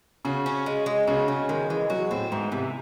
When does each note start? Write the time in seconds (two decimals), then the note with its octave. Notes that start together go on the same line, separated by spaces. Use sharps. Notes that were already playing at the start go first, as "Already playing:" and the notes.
0.25 C#3 F#4
0.46 C#4
0.66 G#3
0.86 G#3
1.07 C#3 F#4
1.28 C#3 C#4
1.49 D#3 G#3
1.70 E3 G#3
1.90 F#3 F#4
2.11 A2 C4
2.32 G#2 E3
2.52 C3 E3